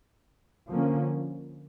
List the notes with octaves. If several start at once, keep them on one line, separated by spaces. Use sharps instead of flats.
D3 F3 A#3 C#4